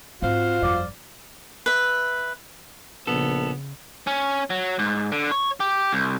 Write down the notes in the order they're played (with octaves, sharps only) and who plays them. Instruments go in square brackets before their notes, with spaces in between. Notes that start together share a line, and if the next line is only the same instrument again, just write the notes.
[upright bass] G#2 C4 [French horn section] F4 [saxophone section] F#4 C5 F5
[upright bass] G1 F2 [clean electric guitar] D5
[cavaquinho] B4 E5
[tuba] A#1 [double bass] C#3 [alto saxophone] B3 [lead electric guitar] A4
[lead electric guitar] C#4
F#3
G#2
D3
C#5
G4
C2